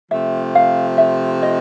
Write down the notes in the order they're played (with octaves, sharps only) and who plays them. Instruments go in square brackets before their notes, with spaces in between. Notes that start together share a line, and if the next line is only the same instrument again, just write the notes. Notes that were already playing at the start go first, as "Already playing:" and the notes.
[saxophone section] C3 F3 A3 [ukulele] E5
[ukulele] F5
E5
D#5